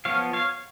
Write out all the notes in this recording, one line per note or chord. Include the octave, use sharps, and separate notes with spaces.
F3 B3 C#5 F5
C#5 F5